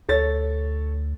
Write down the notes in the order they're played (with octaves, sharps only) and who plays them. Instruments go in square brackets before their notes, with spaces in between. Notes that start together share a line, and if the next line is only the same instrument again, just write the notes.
[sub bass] D2 [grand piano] A4 C#5 A6